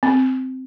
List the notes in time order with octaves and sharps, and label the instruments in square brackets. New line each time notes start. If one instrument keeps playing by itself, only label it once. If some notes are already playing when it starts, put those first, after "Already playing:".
[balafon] C4